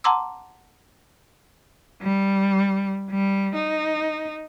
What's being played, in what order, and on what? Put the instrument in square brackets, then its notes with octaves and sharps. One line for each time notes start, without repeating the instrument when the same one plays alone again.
[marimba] F#5 A5 A#5 C6 D6 E6
[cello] G3
G3
D#4